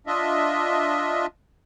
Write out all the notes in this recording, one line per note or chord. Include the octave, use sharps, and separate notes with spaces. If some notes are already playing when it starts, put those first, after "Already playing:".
D4 F4 D#5 E5